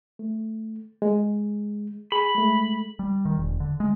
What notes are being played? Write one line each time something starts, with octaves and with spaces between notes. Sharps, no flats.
A3
G#3
G#4 B5
G#3 A3
G3
D#3
E1
D3
G#3